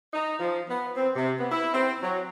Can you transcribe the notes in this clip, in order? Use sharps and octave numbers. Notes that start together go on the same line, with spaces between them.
D#4
F3
B3
C4
C3
B3
E4
C4
F#3